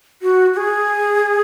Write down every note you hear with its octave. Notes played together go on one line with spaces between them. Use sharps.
F#4
F#4
G#4